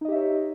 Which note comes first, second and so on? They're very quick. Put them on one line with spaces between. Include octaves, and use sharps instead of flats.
D#4 D#5 G4 E5 C#5